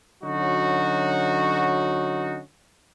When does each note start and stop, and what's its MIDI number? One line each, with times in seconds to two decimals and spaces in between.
0.23 2.40 50
0.23 2.40 54
0.23 2.40 61
0.23 2.40 63
0.23 2.40 66